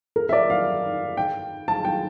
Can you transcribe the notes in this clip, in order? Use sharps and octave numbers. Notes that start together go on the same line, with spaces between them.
A#4
E5
D5
F5
G5
A5
G5